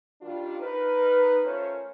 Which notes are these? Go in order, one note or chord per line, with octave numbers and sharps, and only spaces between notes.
D#3 G3 D4 F4
D#4 A#4 B4
A3 C#4 F4 A#4 C5 C#5